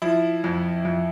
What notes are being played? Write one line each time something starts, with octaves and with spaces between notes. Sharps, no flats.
F3 E4
F2
F2